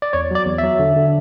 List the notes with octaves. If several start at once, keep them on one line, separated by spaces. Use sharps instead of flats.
D5
E2 C#5
F#3 D5
E2
E5
F#3
D3
D3